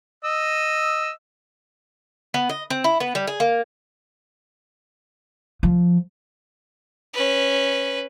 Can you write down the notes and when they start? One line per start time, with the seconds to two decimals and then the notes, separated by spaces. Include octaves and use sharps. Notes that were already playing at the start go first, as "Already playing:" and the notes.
0.24 D#5 E6
2.34 B3
2.49 D#5
2.70 C4
2.84 E4
3.00 B3
3.15 G3
3.27 G#4
3.40 A#3
5.63 F3
7.13 C#4 B4